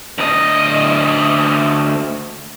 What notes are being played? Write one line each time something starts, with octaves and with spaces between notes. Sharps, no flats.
D2 D#5